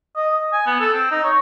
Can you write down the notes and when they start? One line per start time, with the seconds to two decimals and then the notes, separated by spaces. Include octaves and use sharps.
0.16 D#5
0.34 D#5
0.53 G#5
0.66 B3
0.80 A4
0.93 C4
1.11 D#4
1.24 C#5